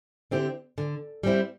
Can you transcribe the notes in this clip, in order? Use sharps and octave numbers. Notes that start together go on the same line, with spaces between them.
D3 C4 E4 G4
D3
G3 C4 E4